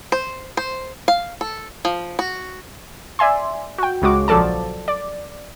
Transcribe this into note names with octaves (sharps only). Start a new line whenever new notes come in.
C5
C5
F5
A4
F3
F#4
D5 E5 G#5 C6
F#4 G5
C#2 C#3 G#3 F#4 D6
A#1 F3 F#3 A4 D5 A5
D5